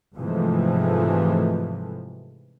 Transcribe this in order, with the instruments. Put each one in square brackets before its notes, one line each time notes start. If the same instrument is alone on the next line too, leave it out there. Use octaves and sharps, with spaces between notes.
[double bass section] G#2 C3 E3 F3 G#3 A3